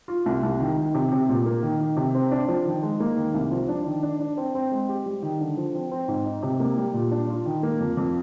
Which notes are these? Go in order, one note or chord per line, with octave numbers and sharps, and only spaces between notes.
F4
C2
C2
D#3
D#3
C3
C3
A#2
A#3
D#3
D#3
C3
C4
D4
F3
D#3
G#3
A#3
D#3
C2
F3
D4
D#3
D4
D4
C4
C4
G#3
G4
G3
D#3
D3
F3
C4
C4
G#2
D#4
C3
A#3
G3
A#2
D4
F4
D#3
A#3
F2
F2